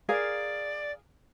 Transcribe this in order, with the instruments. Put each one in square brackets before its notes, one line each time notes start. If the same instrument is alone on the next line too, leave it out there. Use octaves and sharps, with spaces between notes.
[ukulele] G#4 A#4 F5 [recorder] D5